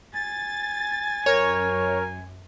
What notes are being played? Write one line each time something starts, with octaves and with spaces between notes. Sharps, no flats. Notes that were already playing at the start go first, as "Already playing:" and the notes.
G#5 A6
F#2 A#4 C#5